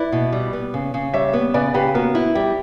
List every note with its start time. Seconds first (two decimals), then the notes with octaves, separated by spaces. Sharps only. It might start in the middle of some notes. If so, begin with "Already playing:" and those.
Already playing: E4 B4 D5
0.12 B2
0.32 G3
0.53 B3
0.74 C#3
0.94 C#3
1.13 G3 C#5 E5
1.33 B3
1.54 C#3 B4 D5
1.74 C#3 G4 B4
1.94 B3 F#4 A#4
2.15 E4
2.35 G3 G4